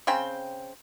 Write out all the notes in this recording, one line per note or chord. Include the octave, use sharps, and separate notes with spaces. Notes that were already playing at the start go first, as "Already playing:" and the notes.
C#3 C4 G5 C6